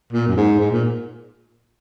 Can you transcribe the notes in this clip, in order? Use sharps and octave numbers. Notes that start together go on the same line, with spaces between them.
A#2
F#2
G#2
G#2
A#2